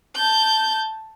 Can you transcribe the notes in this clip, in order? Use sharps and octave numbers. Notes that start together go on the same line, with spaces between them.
A5 G6